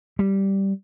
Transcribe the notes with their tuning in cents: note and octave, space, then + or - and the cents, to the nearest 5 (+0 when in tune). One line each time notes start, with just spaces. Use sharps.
G3 -5